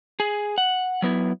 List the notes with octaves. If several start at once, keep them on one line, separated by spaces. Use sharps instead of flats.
G#4
F#5
F#3 B3 E4